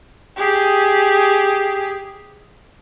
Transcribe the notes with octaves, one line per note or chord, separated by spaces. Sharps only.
G4 G#4